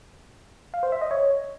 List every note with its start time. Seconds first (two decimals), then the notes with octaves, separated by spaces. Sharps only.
0.74 F5
0.83 C5
0.92 E5
1.02 D#5
1.11 C#5